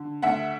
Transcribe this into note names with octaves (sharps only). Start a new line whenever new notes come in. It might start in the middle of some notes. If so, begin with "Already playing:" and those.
Already playing: D3
D2 E5 F#5